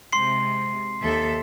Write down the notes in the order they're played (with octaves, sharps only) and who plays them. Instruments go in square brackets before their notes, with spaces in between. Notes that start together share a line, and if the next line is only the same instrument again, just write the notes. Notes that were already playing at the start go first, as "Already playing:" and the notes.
[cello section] C3 G#3 [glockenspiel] C6 C7
[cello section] D#2 A4 E5